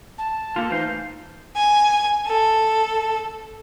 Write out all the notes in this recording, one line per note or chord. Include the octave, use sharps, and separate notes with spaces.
A5
A#3 F4 G4 A4
E3 A3 D#4 F4 C5
G#5
A4